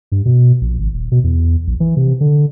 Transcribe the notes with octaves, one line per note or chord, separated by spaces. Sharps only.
G2
B2
A#1
G#1
D#1
B2
E2
A#1
E3
C3
D3